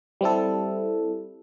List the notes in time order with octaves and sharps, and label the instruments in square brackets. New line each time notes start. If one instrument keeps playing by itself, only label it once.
[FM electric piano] G3 C4 E4 A4